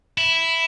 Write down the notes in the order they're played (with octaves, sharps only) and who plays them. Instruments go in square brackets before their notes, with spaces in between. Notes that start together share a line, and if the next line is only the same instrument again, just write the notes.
[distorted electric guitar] E4